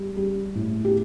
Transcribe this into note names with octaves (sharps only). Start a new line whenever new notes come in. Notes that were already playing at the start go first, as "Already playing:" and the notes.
Already playing: G3
G3
A2
G4